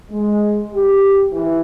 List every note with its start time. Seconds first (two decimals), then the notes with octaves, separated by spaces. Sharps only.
0.11 G#3
0.73 G4
1.32 E3